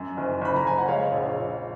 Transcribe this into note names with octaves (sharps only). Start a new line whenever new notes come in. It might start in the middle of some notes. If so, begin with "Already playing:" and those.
Already playing: F#2
F#1
F#1 B5
A#5
F#1 G#5
F#5
G#3 C#5 F5
A#1
A#1